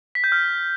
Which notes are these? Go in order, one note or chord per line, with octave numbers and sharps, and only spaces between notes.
B6
G6
F6